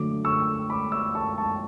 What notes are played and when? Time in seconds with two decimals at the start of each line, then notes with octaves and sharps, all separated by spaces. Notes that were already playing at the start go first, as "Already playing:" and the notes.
Already playing: D3 F#3 A3 D6
0.24 C#6 E6
0.70 B5 D6
0.92 C#6 E6
1.15 A5 C#6
1.38 A5 C#6